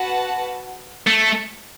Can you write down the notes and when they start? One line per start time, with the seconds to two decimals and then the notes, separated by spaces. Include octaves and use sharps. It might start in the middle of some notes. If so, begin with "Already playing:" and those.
Already playing: F#4 B4 F#5 A5
1.07 A3